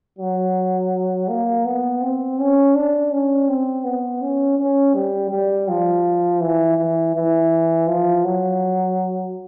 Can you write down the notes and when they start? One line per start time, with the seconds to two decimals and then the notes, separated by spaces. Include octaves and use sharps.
0.18 F#3
1.29 A#3
1.65 B3
2.02 C4
2.39 C#4
2.75 D4
3.12 C#4
3.49 C4
3.85 B3
4.22 C#4
4.58 C#4
4.94 G3
5.31 G3
5.68 F3
6.41 E3
6.78 E3
7.14 E3
7.88 F3
8.24 F#3